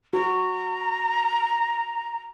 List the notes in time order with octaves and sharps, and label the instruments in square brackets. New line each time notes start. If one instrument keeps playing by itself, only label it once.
[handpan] F#4 [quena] A#5